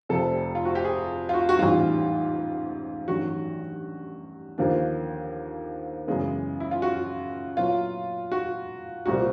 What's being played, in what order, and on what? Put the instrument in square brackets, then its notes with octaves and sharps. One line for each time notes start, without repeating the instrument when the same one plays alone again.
[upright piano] F1 F2 C3 [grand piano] A4
[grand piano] F4
F#4
G4
G#4
F4
F#4
F#4
[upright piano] A1 G#2 E3 G3 [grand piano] F4
[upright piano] A1 G2 D#3 F#3 [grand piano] F#4
[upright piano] D#2 D3 F3 A#3 D4
F#2 C#3 E3 G#3 B3
[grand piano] E4
F4
F#4
[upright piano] A#2 F#3 B3 E4 [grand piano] F4
[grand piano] F#4
[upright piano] C2 A#2 G3 C4 [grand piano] F#4